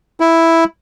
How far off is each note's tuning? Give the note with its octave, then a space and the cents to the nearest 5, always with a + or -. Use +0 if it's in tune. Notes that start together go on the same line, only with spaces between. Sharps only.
E4 +0